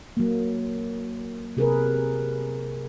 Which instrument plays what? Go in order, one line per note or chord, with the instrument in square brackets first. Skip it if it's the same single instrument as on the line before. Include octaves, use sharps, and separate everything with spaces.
[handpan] F#3 A#3
C3 G#4 A#4 B4